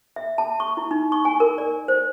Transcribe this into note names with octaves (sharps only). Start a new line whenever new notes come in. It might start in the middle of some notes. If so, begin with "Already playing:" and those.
E5
A5
C#6
E4
D#4
C#6
G#5
A#4
D5
C5